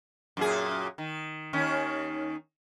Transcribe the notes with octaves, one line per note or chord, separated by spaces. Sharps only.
F#2 A#2 G#4
D#3
D#2 D#3 C#4